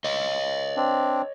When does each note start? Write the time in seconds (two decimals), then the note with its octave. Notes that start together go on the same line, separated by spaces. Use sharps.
0.04 C#5 D#5
0.77 C4 D4